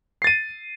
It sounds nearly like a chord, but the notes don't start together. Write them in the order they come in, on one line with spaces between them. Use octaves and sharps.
C7 A6 D#7